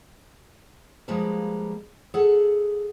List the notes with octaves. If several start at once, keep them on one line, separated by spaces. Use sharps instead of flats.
F3 G3 G#3 A#3 B4
G#4 A4 E5 F#5